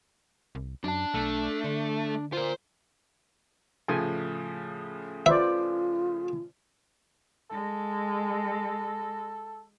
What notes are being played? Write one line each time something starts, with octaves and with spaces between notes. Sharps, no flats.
C2
F#2 D4 A5
B1 A3
D3
F4 A#4 C5
A2 C#3 F3 G#5
F4 B4 C5 D5 E5
G#3 A4